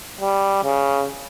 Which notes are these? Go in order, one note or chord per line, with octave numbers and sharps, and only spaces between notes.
G3
C#3